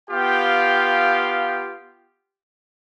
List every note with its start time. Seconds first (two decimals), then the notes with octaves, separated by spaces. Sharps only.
0.10 B3 F4 G4 F5 G5